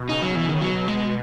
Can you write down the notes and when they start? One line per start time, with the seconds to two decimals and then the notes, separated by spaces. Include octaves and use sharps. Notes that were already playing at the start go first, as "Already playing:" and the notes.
Already playing: B2
0.09 C#3 D#4
0.22 F#3
0.35 E3
0.49 D#3
0.61 B2 F#3
0.88 G#3